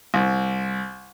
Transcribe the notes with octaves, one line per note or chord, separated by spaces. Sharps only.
C2